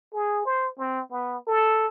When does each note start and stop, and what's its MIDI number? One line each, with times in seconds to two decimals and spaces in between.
0.13 0.43 68
0.46 0.70 72
0.78 1.02 60
1.11 1.37 59
1.47 1.87 69